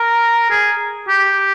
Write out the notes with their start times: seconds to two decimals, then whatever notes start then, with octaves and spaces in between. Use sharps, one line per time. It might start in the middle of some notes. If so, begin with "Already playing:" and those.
Already playing: A#4
0.50 G#4
1.09 G4